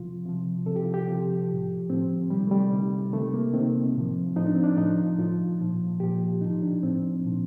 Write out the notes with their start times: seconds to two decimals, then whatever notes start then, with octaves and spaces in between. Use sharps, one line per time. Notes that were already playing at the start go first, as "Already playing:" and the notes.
Already playing: C3 F3 F4
0.25 C3 F3
0.66 C3 F3 A4
0.76 G4
0.85 F4
0.94 G4
1.07 C3 F3
1.48 A2 F3
1.90 A2 F3 C4
2.30 C3 D#3 G3
2.47 A3
2.51 G3
2.72 C3 D#3
3.13 C3 D#3 A3
3.34 A#3
3.54 D#3 C4
3.59 C3
3.96 A2 F3
4.36 A2 F3 D#4
4.46 D4
4.55 C4
4.64 D4
4.77 A2 F3 D#4
5.19 A2 F3 F4
5.60 A#2 F3
6.00 A#2 F3 G4
6.41 A2 F3 D#4
6.63 D4
6.83 A2 F3 C4
7.24 A#2 F3